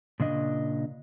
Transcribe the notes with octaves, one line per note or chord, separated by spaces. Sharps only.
A#2 C#3 D4 D#5